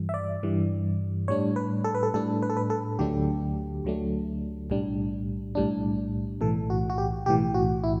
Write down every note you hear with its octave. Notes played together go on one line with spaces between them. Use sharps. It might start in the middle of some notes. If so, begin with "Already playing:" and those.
Already playing: G2 E3 G3
E5
D5
G2 E3 G3
A2 G3 D4 C#5
B4
A4
B4
A4
A2 G3 D4 A4
B4
A4
B4
A4
D2 D3 F#3 A3 D4 G4
D2 D3 F#3 A3 D4
B1 A2 G3 D4
B1 A2 G3 D4
B1 A2 E3 A4
F#4
F#4
G4
B1 A2 E3 G4
F#4
E4